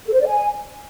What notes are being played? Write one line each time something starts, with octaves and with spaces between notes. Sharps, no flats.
A4
C5
D5
G#5